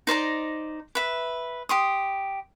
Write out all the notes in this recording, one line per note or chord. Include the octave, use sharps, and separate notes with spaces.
D#4 C5 D5 A#5
B4 E5
G4 C6 D#6